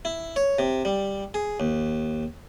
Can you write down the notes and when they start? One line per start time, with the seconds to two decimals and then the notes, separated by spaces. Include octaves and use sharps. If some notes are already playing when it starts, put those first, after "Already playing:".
0.05 E4
0.36 C#5
0.59 C3
0.85 G3
1.34 G#4
1.60 D#2